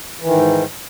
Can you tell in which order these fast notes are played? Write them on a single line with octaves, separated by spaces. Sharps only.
E3 D#3 G#2